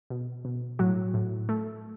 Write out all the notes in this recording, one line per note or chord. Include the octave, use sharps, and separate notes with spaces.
B2
B2
A2 F#3 F#4
A2
A3